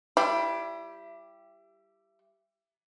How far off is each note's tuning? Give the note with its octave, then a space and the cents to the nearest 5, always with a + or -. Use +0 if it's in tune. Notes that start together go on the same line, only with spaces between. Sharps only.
G3 +0 E4 +30 G4 +0